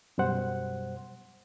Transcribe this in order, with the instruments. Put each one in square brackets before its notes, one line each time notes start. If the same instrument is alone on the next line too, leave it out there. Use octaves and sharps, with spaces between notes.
[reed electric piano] F#2 B2 G3 C5 F#5